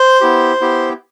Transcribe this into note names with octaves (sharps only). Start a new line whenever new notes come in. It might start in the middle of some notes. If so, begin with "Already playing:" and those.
Already playing: C5 C6
B3 E4 G4
B3 E4 G4